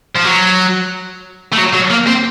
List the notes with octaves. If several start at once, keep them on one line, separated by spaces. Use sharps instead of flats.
F3
F#3
A3
F#3
F#3
A#3
C4